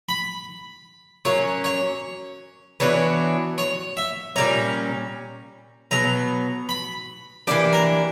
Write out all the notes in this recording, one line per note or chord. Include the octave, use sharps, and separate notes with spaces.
B5
F#3 A#3 C#4 C#5
C#5
E3 B3 D4 F#4 C#5
C#5
E5
A#2 G3 C#4 A#5
B2 F#3 B3 A#5
B5
E3 A#3 D4 G4 D5
A#4